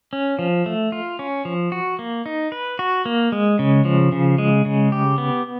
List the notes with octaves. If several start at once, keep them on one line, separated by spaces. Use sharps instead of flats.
C#4
F3
A3
F4
C#4
F3
F#4
A#3
D#4
B4
F#4
A#3
G#3
C#3
F3
C#3
G#3
C#3
G4
B3